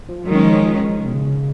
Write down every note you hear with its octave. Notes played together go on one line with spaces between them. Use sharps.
F3
D#3 F#3 G#3 C#4
F3
F3
D#3
C#3
B2
C#3